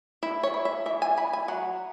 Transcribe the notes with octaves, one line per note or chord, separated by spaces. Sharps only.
E4 E5
C#5
E4
E5
E3 E5
G#5
E4 B5
G#5
F#3 F#5